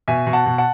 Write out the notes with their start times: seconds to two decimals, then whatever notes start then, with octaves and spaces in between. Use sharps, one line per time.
0.08 B2 E5 G#5
0.27 B2
0.33 F#5 A5
0.46 B2
0.58 F#5 A5